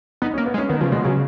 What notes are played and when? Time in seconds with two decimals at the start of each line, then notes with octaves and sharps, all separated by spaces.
0.22 B3 D#4
0.34 C#4
0.38 A#3
0.46 B3
0.54 G#3
0.58 C#4
0.69 D#3 B3
0.81 C#3 F3
0.92 B2 G#3
1.04 C#3 F#3